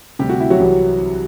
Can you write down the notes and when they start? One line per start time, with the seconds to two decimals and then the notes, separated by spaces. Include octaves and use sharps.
0.19 D2 C3 G3 G4
0.29 F#4
0.40 E4
0.50 F#3 F#4
0.60 C2 C3 E3